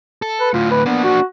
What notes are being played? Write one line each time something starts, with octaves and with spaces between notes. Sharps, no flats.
A4
B4
D2 A2 F4
B4
A#3 B3 D4
F#4